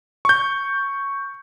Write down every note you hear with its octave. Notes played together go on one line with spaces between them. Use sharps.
C#6 G6